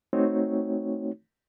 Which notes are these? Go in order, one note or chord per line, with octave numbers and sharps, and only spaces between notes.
A3 C4 D#4 F#4 C#5